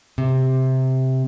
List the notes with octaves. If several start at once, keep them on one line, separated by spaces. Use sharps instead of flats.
C3